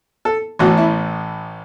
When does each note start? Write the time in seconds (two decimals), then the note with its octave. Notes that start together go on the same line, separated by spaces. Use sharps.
0.25 A4
0.59 A1 A2 E3 F#4
0.78 E4